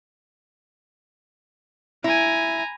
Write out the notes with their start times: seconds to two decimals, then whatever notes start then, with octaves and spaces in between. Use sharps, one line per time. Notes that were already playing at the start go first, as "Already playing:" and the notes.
2.04 E4 G#5 A#5